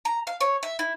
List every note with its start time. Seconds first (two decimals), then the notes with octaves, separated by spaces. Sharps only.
0.05 A#5
0.27 F5
0.41 C#5
0.63 E5
0.79 E4